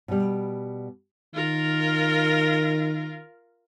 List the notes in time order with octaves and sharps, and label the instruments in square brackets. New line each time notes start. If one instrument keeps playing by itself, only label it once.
[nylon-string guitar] B2 G3
[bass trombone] D#3 [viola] F4 A#4